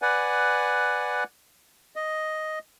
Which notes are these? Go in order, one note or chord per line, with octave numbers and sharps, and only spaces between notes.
B4 D5 F#5 G#5
D#5